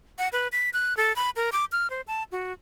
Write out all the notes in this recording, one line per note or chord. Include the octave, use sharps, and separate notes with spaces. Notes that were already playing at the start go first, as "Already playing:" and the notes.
F#5
B4
B6
F#6
A4
B5
A#4
D6
F6
C5
A5
F#4